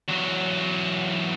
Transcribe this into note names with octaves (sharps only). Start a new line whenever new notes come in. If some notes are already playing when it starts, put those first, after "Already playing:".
E2 F#3